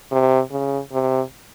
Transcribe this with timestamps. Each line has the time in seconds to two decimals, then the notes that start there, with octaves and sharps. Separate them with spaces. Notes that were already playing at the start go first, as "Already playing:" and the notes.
0.12 C3
0.51 C#3
0.93 C3